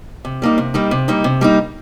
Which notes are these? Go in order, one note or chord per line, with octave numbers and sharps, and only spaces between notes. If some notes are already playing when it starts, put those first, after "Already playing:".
C3
G3 A#3 D#4
C3
G3 A#3 D#4
C3
G3 A#3 D#4
C3
G3 A#3 D#4